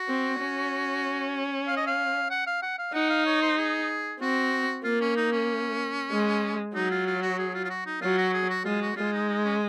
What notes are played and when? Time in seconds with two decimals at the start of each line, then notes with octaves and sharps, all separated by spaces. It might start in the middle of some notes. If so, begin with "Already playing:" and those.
Already playing: F#4
0.09 C4
0.41 C#4
1.67 F5
1.77 D#5
1.87 F5
2.31 F#5
2.47 F5
2.62 F#5
2.79 F5
2.94 D#4 F#5
3.10 F5
3.26 C#5
3.42 C5
3.57 G#4
4.21 C4 F#4
4.84 A#3 F4
5.01 C#4
5.16 D#4
5.32 C#4
6.12 G#3
6.75 F#3 D#4
6.91 F4
7.07 F4
7.22 F#4
7.39 G#4
7.54 F4
7.65 F4
7.70 F#4
7.86 D#4
8.02 F#3 F4
8.18 F#4
8.33 G#4
8.50 F#4
8.65 G#3 F4
8.81 F#4
8.97 G#3 F4
9.13 D#4
9.29 D#4
9.45 C#4